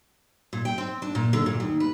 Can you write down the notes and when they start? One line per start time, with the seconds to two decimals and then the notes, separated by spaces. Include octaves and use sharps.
0.53 A#2
0.65 G5
0.78 C4
1.02 D4
1.15 A#2
1.33 D3
1.46 A#2
1.60 D#2
1.80 B4